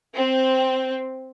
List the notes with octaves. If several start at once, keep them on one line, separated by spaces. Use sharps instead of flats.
C4